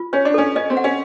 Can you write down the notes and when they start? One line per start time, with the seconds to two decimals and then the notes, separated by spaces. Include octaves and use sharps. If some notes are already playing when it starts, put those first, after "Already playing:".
Already playing: F4
0.13 C#4 C#5
0.25 D4
0.34 C#4 A4
0.56 C#4 D#5
0.70 C4
0.77 F#5
0.84 C#4